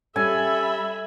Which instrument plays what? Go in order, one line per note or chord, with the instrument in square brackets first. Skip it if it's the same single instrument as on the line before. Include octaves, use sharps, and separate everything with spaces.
[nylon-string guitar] G3 C#4 [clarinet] A4 [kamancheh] E5 B5 [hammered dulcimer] G#5